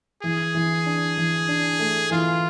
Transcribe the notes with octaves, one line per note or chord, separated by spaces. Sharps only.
E3 G#4
E3
D4
E3
D4
A3
E3 F4